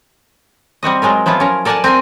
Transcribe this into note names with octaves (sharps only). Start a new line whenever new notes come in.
G3 C4 F#4 D#5
F#3 G#3 F4 A#4
F3 F#3 B3 E4 F4
C#4 A#4
A4 A#4 D5 F#5 G#5 A5
C4 A#4 G5 G#5